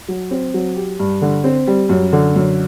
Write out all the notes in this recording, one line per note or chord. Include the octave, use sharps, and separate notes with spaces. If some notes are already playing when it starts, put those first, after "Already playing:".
F#3
C4
F#3
G4
G2
D3
C4
G3
F#2
D3
F#2